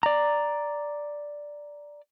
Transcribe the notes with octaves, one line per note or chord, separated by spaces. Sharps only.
D5 A#5